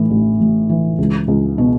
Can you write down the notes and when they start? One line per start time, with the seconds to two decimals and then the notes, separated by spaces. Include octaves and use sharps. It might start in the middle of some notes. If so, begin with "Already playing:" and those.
Already playing: A2 E3
0.10 A1
0.40 A1
0.69 E3
0.98 C#2
1.28 C#2
1.58 B2